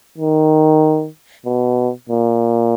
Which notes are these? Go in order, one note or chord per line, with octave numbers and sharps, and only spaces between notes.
D#3
B2
A#2